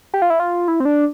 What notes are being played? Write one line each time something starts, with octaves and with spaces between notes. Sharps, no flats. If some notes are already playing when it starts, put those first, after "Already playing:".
G4
F4
E4
F4
E4
C4
D4